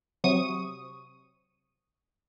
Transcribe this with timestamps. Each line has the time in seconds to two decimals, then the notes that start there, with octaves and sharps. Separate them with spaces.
0.24 C3 F#3 C4 C#6 D#6 D#7